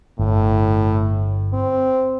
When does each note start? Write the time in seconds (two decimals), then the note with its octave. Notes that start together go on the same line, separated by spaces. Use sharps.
0.19 G1 A2
1.54 C4